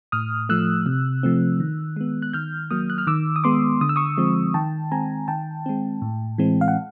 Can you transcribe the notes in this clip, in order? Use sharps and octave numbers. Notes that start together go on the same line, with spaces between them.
A2 D#6 F6
F3 A3 E6 F#6
C3
F3 A3 C4
D#3
G#3 B3
F#6
D#3 F6 G6
F#3 A#3 D#6 F6
F#6
F6
D#3 D6 E6
D#6
G#3 B3 C6 D6
D3 D#6
E6
C#6 D#6
F3 G#3 C4
D#3 G5 A5
G#3 C4 G#5 A#5
D#3 G5 A5
G#3 C4
A2
E3 G#3 C4
F5
F#5